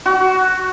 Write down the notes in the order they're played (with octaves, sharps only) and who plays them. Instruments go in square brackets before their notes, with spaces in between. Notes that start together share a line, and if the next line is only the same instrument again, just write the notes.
[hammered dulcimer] F#4